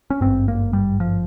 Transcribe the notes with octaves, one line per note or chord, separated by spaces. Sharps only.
C#4
G#1 G2 C4
A#3
G3
F3